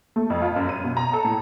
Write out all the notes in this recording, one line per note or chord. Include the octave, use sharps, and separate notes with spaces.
A3
F2
F4
F#2
D#7
B2
A#5
A4
A2